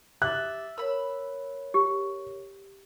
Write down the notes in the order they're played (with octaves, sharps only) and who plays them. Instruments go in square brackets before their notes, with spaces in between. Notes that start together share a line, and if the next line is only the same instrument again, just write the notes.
[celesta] G4 D6 A6 [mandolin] E5 [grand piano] F#6
[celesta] A#4 C#5 [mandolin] B5 E6
[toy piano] G4